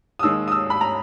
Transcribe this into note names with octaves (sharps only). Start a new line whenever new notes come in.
D#6
D#2 D#3 G#3 E6
D#6
E6
B5
A#5